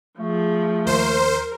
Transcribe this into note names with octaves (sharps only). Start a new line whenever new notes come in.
F3 A3 G#4
D#2 A#4 C5